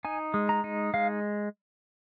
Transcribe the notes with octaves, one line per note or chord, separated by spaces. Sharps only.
D#4 G#5
G#3
A#5
D#4
G#3 F5